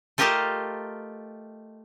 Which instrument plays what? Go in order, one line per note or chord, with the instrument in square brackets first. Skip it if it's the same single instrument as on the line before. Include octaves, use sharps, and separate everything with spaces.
[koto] A3 F4 G4 A#4 D#5 A5